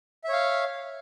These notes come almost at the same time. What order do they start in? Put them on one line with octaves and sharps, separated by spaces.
E5 C#5 F5